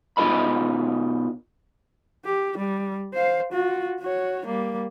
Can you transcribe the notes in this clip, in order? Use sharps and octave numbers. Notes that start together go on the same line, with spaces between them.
B2 D#4 F4 A#4 D#5 B5
G4
G3
C5 F5
F4 F#4
F#4 C#5
G3 A#3